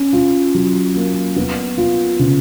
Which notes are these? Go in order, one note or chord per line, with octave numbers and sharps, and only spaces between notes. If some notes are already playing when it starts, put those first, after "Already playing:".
Already playing: C#4
F4
F#3
A#3
B3
F4
C#3